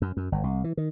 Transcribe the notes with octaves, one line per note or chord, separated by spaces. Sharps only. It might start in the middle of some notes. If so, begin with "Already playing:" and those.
F#2
F#2
G1
C2
E3
D#3